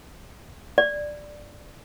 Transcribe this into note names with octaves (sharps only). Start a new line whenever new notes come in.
D5